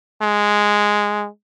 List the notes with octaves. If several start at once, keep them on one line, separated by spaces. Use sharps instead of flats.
G#3